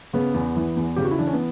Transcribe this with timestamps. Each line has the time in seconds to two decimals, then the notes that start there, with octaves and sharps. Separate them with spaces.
0.13 C#3 B3
0.34 E2
0.56 E3
0.76 E2
0.96 C#3 G4
1.05 F#4
1.11 E4
1.18 E3 D4
1.27 C#4
1.33 B3